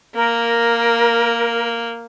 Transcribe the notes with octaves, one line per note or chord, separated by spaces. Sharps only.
A#3 A#4